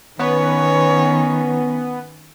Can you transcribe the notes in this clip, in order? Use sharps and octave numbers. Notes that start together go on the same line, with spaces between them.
D#3 B3 C#4 C#5